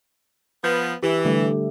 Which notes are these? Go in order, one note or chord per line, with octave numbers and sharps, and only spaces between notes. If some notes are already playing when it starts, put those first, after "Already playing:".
F3 B3
E3 G4
D3 G3 A3